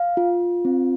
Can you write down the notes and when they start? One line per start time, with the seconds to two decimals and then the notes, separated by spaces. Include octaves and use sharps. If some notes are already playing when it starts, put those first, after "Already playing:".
Already playing: F5
0.17 F4
0.65 C4